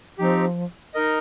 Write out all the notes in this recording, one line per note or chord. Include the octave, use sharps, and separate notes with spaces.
F3 C4 D#4 G4
D#4 A#4 D#5